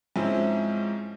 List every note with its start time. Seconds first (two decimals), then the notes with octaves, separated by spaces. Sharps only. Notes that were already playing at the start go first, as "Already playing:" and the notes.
0.16 G#2 F3 C4 C#4 E4